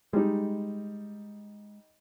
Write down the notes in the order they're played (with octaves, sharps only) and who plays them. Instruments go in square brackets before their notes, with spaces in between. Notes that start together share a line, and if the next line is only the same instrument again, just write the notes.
[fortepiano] G3 D#4 [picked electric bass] G#3